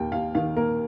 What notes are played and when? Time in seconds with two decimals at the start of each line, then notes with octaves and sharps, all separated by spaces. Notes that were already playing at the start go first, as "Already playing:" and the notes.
Already playing: D#2 A#3 G5
0.12 D#2 F5
0.35 D#3 F5
0.56 A#3 A#4